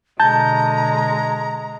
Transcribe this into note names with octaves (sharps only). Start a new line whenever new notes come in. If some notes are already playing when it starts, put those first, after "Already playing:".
B2 D3 G#3 A5 A#5 G6